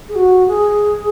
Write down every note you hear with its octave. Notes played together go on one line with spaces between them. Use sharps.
G#4
F#4
G#4